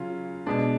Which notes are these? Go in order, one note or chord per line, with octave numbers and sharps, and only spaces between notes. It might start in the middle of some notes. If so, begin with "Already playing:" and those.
Already playing: C#3 F#3 C#4 F4
B2 G#3 D4